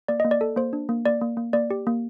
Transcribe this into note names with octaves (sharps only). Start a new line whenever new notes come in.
A#3 D5
D#5
A#3
D5
A4
A#3 C5
D4
A#3
A#3 D5
A#3
A#3
A#3 D5
G4
A#3